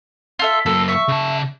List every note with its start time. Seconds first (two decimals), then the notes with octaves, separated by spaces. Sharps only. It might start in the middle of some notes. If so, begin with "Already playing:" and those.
0.39 F4 A4 E5
0.66 F#2 A#3 A4
0.88 E5 C#6
1.08 C#3 A5